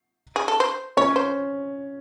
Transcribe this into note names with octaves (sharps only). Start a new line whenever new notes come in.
G#4
A4
C5
C#4 C#5
C5